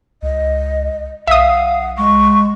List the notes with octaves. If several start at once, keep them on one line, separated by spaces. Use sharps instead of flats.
C#2 D#5
B1 E5 F5 D#6
F#5
G#3 C#6